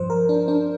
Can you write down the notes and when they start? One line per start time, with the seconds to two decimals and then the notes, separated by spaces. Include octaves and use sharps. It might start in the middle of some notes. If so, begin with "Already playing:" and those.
Already playing: G2 F3 C5
0.10 A#4
0.29 D4
0.48 D4